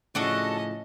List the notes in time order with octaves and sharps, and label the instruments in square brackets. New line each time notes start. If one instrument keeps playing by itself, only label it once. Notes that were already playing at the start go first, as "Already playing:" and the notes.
[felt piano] A2 F3 [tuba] C#3 [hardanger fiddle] C#4 D#5 [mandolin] D4 F#4 A4